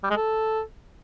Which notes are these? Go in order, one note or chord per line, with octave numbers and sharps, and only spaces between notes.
G3
G#3
A4